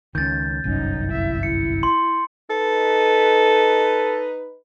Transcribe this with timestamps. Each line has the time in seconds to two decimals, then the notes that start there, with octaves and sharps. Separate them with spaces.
0.15 C#2 D#3 C#4 G6 A6
0.64 G1 C2 F#2 C#4 D#4
1.09 E4 E5
1.43 E4 C#7
1.83 C6
2.50 D#4 A4 B4